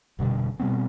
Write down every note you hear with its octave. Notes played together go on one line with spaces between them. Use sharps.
F1 B2 D3 G3
B2 G3 B3 C4